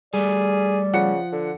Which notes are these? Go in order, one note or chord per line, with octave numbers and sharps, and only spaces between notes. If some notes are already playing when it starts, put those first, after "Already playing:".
G3 A3 G#4 D5
C#3 F3 F#5 C#7
D3